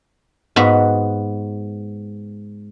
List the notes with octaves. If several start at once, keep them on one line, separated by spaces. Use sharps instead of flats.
G#2 B3 F#4 B4